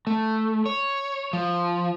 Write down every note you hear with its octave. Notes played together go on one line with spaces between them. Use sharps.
A3
C#5
F3